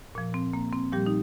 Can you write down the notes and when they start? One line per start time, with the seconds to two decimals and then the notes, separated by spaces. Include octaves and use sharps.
0.15 A#2 F3
0.34 C4
0.53 A#3
0.73 C4
0.93 A#2 F3 G3 G4
1.06 D#4